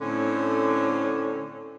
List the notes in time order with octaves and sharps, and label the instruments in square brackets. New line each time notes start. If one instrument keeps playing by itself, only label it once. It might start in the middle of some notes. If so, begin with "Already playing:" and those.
[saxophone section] A2 D3 C4 C#4